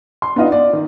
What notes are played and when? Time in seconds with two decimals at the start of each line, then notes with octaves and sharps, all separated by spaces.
0.22 C6
0.36 B3 D4 D#4 F4 D#5 F#5
0.52 D5
0.73 D#3